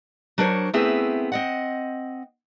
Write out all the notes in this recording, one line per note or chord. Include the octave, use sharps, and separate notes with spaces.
F#3 D4 A#4 C5 C#5
A3 B3 C4 E4 G#4 E5
C4 D#5 F#5